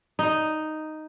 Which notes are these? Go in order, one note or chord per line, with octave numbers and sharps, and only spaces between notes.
D#4